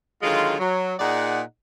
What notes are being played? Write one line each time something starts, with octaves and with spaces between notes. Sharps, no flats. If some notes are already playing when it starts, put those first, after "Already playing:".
D3 D#3 F#3 G#3 F4
F#3
A#2 D#4 G#4 D5 F#5